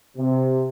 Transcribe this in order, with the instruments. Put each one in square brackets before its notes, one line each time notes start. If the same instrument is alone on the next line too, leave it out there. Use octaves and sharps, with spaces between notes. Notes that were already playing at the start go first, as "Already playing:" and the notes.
[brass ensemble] C3